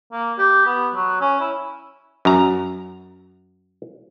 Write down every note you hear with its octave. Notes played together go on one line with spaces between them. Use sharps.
A#3
G4
B3
F#3
C#4
E4
F#2 A#5